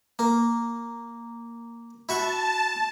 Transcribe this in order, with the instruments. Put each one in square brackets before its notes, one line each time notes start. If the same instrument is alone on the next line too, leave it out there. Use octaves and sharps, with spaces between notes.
[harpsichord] A#3
[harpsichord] E4 F#4 C#6 [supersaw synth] A5